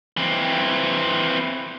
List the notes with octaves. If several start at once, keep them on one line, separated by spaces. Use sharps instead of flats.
E3 C4